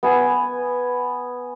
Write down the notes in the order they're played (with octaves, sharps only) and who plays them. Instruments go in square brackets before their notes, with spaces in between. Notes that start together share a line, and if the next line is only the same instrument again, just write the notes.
[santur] B3 G#5